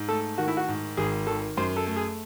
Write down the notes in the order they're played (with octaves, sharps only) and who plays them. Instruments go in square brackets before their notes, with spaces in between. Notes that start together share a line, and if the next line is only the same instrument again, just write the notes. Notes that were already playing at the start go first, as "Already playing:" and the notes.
Already playing: [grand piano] G#2
[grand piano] A3 [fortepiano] A4
[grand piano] D#3 [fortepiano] F#4
[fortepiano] E4
F#4
[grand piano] G#2
[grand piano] G#1 [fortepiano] G#4
[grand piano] D#3 [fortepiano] A4
[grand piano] F#2 [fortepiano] C5
[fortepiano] A4
[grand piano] A3
[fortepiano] G#4